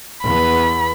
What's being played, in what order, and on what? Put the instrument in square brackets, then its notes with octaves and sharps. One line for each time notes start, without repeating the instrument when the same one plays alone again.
[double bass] E2 B3 [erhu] B5